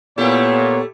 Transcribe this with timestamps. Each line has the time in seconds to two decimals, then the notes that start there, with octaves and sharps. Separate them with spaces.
0.18 A#2 A3 B3 E4 G4 C#5